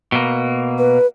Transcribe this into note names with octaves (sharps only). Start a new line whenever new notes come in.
B2 A#3
B4